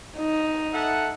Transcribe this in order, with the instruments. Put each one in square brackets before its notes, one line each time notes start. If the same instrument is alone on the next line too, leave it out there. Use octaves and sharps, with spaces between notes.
[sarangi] D#4
[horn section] A4 E5 F#5